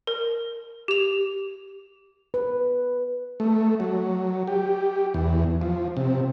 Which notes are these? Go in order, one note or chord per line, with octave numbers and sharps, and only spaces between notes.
A#4
G4 F7
B4
A3
F#3
G4
E2
F3
C3